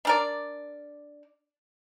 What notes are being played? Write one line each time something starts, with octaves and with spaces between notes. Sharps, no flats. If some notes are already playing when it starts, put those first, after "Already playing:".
D4 A#4 D5